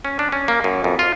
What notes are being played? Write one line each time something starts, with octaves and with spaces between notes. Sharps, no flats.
C#4
D4
C#4
A#3
F#2
F2
F4